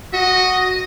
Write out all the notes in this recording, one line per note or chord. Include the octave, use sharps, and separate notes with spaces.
F#4 D#5